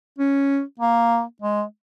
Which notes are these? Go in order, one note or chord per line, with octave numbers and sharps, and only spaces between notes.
C#4
A#3
G#3